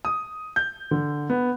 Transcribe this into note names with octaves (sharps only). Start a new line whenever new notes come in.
D#6
G6
D3
B3